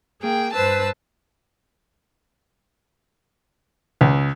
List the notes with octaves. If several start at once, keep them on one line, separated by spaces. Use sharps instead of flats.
A#3 G#4 G5
G2 B4 C5 A5 E6
C#2